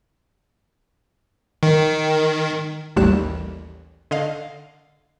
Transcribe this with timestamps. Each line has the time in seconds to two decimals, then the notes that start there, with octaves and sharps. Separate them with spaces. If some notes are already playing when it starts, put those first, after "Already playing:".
1.63 D#3
2.96 A1 D#2 G3 F#6 E7
4.11 D3 D#5 F5